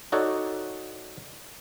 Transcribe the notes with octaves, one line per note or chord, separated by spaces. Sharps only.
D#4 F#4 A4 C#5 D5 F#5